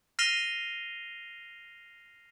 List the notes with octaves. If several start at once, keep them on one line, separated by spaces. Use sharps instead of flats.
F6 A#6 C7 D#7 F7 G7